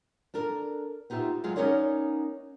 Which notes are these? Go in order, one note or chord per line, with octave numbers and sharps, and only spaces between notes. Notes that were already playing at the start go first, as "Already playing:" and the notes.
D4 A4 A#4
B3 D#4 F4 G4 E5
F#3 G#3 F4 G#4
B3 C#4 D#4 A#4 C#5 D5